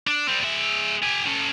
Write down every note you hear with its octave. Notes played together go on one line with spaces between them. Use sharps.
D4
G3 C4
G#3 E5
G4 G#5
C#4 A4